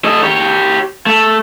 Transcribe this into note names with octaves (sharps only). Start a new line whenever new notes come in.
A3 D#5
G4 C#5
A3